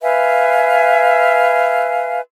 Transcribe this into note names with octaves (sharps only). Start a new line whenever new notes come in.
B4 E5 F5 G#5